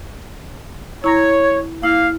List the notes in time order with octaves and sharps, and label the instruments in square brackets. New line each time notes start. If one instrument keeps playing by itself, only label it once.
[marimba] E4 A#5 A#6 [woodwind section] C#5
[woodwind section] A#3 F5 [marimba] E4